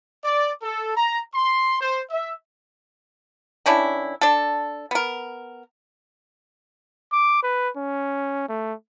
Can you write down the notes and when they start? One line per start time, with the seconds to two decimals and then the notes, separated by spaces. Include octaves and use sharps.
0.24 D5
0.62 A4
0.95 A#5
1.35 C6
1.80 C5
2.10 E5
3.66 D#3 C#4 D4 E4
4.21 D4 A4
4.91 B3 A#4
7.12 D6
7.43 B4
7.77 C#4
8.49 A3